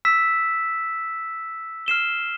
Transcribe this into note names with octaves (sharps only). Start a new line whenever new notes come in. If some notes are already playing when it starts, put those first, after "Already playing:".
E6 B6 E7
F6 C7 E7 G7